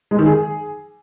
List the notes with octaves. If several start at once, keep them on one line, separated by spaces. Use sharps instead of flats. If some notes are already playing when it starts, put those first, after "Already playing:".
G#3
D#3
G#4